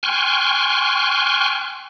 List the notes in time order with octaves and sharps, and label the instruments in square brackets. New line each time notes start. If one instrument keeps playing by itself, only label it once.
[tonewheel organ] G5 G#5 C6 C#6 F6 F#6